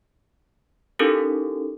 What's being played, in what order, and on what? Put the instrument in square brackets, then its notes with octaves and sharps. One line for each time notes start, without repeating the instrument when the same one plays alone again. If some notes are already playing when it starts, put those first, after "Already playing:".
[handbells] C#4 D#4 E4 G4 A4 A#4